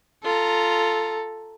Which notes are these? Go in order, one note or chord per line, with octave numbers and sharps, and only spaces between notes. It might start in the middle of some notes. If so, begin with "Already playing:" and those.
F4 A4 A#5